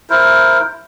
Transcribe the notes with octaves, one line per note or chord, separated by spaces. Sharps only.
E4 A#4 C5